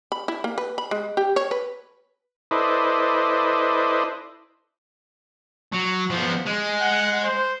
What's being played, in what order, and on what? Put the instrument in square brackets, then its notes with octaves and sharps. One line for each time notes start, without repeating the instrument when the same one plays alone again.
[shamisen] B5
E4
A#3
B4
B5
G#3
G4
C#5
B4
[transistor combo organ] E4 A4 B4 C5 D5 D#5
[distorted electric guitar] F#3
F3 B3
G#3
[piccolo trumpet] F#5
C5